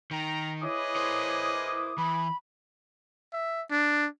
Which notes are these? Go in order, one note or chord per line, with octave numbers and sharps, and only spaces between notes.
D#3 G5 A#5
E4 G#4 B4 C#5 D#5 D6 D#6
A#4 C5
E3 B5
E5
D4